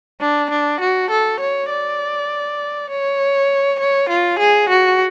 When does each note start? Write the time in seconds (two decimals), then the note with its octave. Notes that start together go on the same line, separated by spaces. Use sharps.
0.21 D4
0.50 D4
0.80 F#4
1.11 A4
1.40 C#5
1.70 D5
2.90 C#5
3.79 C#5
4.09 F4
4.39 G#4
4.69 F#4